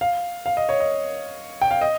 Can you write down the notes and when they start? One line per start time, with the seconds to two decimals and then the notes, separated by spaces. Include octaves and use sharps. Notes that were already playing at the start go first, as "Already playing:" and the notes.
0.01 F5
0.46 F5
0.57 D#5
0.69 C#5
0.80 D#5
1.62 G5
1.71 F5
1.81 D#5